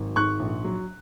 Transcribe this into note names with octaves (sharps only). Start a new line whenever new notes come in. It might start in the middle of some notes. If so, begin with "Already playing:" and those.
Already playing: G#1 F#3
G#2 C#6 F#6
A#1
F#3